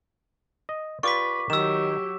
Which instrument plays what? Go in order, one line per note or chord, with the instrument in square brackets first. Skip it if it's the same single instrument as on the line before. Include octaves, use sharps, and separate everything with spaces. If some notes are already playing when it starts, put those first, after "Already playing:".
[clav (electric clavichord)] D#5
[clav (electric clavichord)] F4 G4 D5 [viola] B4 [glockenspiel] C#6 D6 B6
[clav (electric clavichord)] D#3 [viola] F#3 G4 [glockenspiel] E6 E7